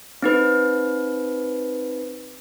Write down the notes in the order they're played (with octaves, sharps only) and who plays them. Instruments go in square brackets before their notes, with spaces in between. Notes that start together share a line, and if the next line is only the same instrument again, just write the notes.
[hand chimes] C4 D#4 B4